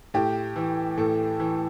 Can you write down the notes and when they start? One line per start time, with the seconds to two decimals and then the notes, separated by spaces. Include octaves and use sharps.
0.14 A2 G4
0.56 E3
0.98 A2 A4
1.40 E3